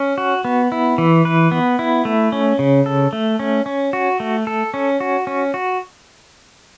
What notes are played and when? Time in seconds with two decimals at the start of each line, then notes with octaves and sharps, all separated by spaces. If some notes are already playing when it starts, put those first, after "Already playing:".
Already playing: C#4
0.18 F#4
0.45 B3
0.72 E4
0.98 E3
1.25 B4
1.51 B3
1.79 E4
2.05 A3
2.32 C#4
2.59 C#3
2.86 A4
3.13 A3
3.39 C#4
3.66 C#4
3.93 F#4
4.20 A3
4.47 A4
4.74 C#4
5.00 F#4
5.27 C#4
5.54 F#4